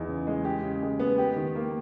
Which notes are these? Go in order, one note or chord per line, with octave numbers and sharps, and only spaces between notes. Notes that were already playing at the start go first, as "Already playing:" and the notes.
Already playing: E2 D#4
C#3
G#3
G4
C#3
G#3
B3
G4
D#3
A#3